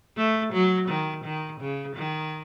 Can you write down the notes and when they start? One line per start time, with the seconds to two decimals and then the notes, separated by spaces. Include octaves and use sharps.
0.17 A3
0.53 F#3
0.88 D#3
1.24 D#3
1.60 C#3
1.96 D#3